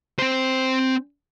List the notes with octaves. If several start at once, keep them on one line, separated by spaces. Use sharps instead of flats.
C4 C5